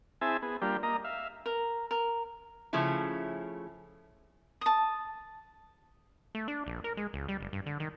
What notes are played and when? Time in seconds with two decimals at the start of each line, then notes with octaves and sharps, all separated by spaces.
0.21 C4 E4 G#4 E5 G#5 A5
0.42 B3 G#4
0.62 G3 A#3 D4 F4 G4
0.83 A#3 D#5 A#5
1.04 E5 F5
1.46 A#4
1.91 A#4
2.73 C#3 F3 A3 C#4 E4
4.61 A5 D#6
6.35 A3
6.48 D4
6.66 A#1
6.84 A#4
6.97 G#3
7.13 C#2
7.28 G3
7.41 F#1
7.53 G2
7.66 D3
7.80 D#3